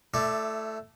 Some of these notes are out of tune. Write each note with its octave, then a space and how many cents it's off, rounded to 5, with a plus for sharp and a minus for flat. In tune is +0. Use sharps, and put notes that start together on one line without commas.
A3 +0 E4 +25 D5 +5